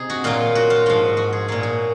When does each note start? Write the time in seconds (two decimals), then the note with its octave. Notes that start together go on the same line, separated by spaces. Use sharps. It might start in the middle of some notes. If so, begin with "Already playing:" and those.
Already playing: C3 C4 D#4 G#4
0.10 F#4
0.24 A#2 F#3 F4
0.55 F#4
0.70 F4
0.86 G#2 F3 F#4
1.17 F#4
1.33 G#4
1.48 A#2 F#3 G#4
1.63 F#4